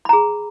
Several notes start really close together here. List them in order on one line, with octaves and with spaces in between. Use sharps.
B5 A#5 G#4